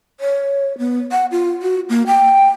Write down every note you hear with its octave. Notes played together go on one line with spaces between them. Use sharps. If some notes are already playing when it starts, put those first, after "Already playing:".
C#5
B3
F#5
F4
F#4
A#3
G5